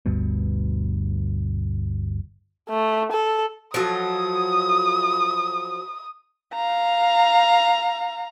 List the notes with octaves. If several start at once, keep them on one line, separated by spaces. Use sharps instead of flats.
G1 D2 G2 B2
A3
A4
F3 F#3 A4 D#6
F5 A#5